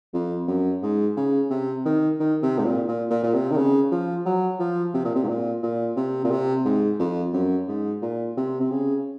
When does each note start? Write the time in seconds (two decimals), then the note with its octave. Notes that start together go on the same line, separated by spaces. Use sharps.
0.14 F2
0.48 F#2
0.83 G#2
1.17 C#3
1.50 C3
1.85 D#3
2.20 D#3
2.42 C3
2.59 G#2
2.65 A#2
2.88 A#2
3.11 A#2
3.23 A#2
3.34 C3
3.51 D#3
3.57 C#3
3.92 F3
4.26 F#3
4.60 F3
4.94 C3
5.05 A#2
5.15 C3
5.24 G#2
5.28 A#2
5.63 A#2
5.96 C3
6.24 A#2
6.31 C3
6.65 G#2
6.99 F2
7.33 F#2
7.68 G#2
8.02 A#2
8.37 C3
8.60 C3
8.71 C#3